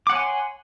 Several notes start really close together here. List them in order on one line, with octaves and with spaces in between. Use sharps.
D6 F#5 C#5 G#5 C6